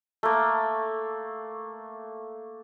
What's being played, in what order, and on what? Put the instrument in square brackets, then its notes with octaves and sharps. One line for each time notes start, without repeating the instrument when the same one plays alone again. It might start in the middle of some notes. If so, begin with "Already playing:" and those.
[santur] A3 A#3